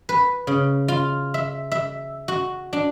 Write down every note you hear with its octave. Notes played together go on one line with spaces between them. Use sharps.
B4
C#3
F4
E5
E5
F#4
D4